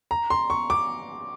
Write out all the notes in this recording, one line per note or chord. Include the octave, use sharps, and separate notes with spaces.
A#5
C6
C#6
D6